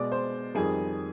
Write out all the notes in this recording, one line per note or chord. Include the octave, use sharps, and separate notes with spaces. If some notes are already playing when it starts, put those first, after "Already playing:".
Already playing: B2 G#3 D5 D6
C5 C6
F2 D#3 G3 G#4 G#5